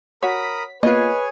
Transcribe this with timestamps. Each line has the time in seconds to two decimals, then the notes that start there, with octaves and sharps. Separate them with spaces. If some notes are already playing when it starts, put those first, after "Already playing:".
0.23 F#4 A#4 C#5 B5 D#6 B6
0.83 A#3 B3 F4 G#4 B4 C#5 D#5 G#5